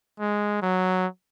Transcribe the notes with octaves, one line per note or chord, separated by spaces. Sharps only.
G#3
F#3